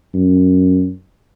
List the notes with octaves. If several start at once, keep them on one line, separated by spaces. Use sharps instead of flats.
F#2